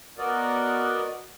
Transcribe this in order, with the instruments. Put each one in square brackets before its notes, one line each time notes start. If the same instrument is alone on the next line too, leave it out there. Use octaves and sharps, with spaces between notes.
[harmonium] B3 F#4 A#4 D5 D#5